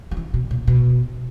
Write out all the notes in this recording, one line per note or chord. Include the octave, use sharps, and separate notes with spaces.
F3
E3
B2
A#2
B2